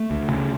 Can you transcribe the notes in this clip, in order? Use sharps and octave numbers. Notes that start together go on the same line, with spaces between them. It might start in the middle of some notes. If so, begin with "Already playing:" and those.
Already playing: A3
D2
C#3